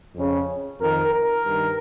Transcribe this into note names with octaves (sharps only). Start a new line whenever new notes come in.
F2 C#3
F2 D#3 A#4
A#4
G2 D#3